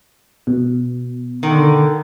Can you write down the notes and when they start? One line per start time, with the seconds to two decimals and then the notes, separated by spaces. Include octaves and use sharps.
0.47 B2
1.43 D3 D#3